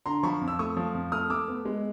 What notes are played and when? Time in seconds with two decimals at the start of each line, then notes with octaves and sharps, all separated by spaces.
0.06 D3 A#5 C6
0.23 F3 B5 C#6
0.41 F2
0.48 E6
0.59 A3 C#6 D#6
0.77 F3
0.95 F2
1.12 A3 D#6 F6
1.30 A3 D6 E6
1.48 B3
1.65 G#3